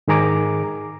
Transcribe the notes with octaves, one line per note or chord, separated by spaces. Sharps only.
G#2 D#3 G#4 A#5 D6